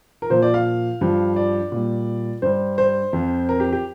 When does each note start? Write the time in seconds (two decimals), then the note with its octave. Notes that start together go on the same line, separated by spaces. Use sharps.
0.22 A#4
0.30 A#2 F3 C5
0.42 D5
0.54 F5
1.01 G2 F3
1.36 D5
1.72 A#2 G3
2.42 G2 G3 C5
2.78 C5
3.13 F2 F3
3.49 A#4
3.60 G4
3.72 G4